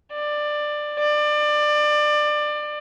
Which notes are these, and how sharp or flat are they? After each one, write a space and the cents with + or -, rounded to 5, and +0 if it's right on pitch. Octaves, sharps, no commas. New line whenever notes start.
D5 +15
D5 +25